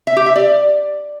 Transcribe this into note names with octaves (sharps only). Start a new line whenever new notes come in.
E5
G4
E5
D5